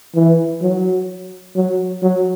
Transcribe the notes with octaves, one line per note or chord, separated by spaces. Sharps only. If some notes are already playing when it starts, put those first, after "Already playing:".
E3
F#3
F#3
F#3